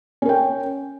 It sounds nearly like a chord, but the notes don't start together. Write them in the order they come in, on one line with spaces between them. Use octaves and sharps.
C#4 A#4 G5